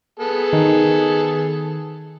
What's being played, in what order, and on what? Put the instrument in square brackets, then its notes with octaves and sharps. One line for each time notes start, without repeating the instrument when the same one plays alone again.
[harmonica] B3 G#4 A4
[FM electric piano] D#3